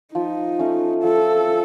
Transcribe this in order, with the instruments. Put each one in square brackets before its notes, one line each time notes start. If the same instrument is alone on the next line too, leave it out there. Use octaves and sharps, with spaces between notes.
[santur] F3 [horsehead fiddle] D#4
[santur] A3 C#4
[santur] F3 [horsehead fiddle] A4
[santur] C#4